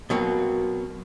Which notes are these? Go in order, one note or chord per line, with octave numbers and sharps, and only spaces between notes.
B2 F#3 A#3 C4 F#4